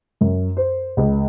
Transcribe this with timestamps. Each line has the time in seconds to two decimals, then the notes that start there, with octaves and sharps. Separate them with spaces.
0.21 F#2
0.57 C5
0.97 C#2